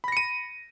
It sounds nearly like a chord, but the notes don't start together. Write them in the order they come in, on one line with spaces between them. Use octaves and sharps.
B5 A#6 C#7 D#7